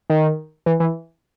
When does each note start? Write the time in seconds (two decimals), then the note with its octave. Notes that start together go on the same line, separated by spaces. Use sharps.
0.10 D#3
0.66 E3
0.80 E3